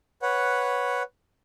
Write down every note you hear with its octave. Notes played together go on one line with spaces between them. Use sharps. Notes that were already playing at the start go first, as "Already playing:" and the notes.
B4 C#5 F#5